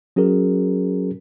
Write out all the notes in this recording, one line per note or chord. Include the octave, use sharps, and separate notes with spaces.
F#3 C#4 F#4 G#4 A#4